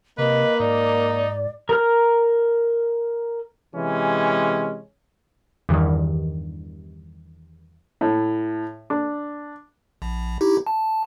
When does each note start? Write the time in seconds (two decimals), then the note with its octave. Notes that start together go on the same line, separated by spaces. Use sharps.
0.18 C3 A#3 B4 D#5
0.60 G#2 D#4 D5
1.69 A#4 A#5 F6
3.74 C3 E3 G#3 C#4
5.69 E2 G2 D#3
8.01 A2
8.90 D4
10.02 A#1
10.41 D#4 E4 G4
10.67 A5